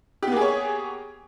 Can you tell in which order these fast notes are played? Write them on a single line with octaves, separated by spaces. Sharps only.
G4 B3 A#3 G#4 C#5